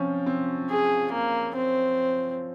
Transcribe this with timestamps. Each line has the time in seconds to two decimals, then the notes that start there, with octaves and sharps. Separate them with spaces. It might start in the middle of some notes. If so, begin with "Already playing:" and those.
Already playing: F3 C4 C#4
0.26 C4
0.70 G#4
1.12 A#3
1.56 C4